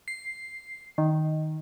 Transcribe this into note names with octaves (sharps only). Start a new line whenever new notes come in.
C7
D#3